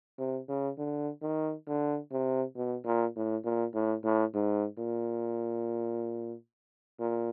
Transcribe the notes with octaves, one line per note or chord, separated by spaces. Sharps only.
C3
C#3
D3
D#3
D3
C3
B2
A#2
A2
A#2
A2
A2
G#2
A#2
A#2